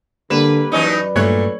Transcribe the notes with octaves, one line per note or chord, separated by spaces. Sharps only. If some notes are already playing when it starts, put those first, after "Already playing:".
D3 G3 A#3 B4 E7
F#2 E3 C#4 D#4 B4 D5
G2 A#2 A3 C#5 F#6